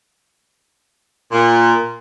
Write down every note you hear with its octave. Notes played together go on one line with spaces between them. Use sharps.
A#2